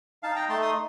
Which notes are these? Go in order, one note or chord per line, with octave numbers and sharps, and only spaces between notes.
D#4 F5 A5
G5 A#5
A3 A5 C6
C6 D#6